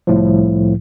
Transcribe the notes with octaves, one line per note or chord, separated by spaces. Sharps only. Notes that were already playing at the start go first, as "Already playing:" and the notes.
C2 A2 F3